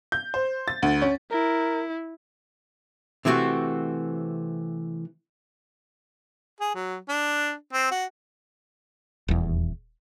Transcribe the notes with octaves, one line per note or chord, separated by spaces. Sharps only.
G6
C5
A6
D2
C#4
E4 A#4
C3 E3 A3 C4 F#4
G#4
F#3
D4
C4
F#4
D#1 E2